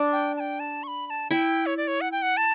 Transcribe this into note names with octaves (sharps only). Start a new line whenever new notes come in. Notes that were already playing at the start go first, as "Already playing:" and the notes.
Already playing: D4
G5
A5
G5
A5
C#6
B5
B5
A5
E4 G5
C#5
D5
C#5
F#5
G5
F#5
A5